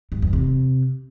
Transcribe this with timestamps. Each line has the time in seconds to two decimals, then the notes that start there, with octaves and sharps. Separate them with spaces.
0.12 G2
0.22 E2
0.33 C3